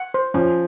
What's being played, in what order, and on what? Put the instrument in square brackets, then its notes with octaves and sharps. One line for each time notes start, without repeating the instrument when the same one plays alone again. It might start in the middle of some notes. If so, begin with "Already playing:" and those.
Already playing: [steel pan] F#5
C5
[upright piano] F3 [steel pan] C#4